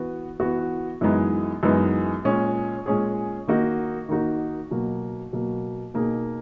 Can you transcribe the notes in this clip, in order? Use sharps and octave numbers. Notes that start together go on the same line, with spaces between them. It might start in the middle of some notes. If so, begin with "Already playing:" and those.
Already playing: E3 B3 F#4
E3 B3 F#4
F#2 E3 G#3 B3 D#4
F#2 E3 G#3 B3 D#4
A#2 G#3 C#4 G#4
A#2 G#3 C#4 G#4
D#3 A#3 D#4 F#4
D#3 A#3 D#4 F#4
B2 F#3 A#3
B2 F#3 A#3
B2 A#3 D#4 G#4